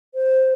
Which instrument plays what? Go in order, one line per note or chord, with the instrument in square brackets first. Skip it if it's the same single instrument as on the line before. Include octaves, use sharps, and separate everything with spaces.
[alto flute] C5